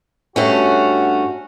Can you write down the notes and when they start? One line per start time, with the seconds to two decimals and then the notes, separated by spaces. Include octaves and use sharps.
0.36 G2 A3 C#4 F#4